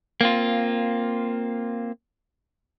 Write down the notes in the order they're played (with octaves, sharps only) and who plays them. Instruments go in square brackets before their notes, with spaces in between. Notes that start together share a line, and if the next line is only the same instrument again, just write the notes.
[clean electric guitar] A#3 C4 F4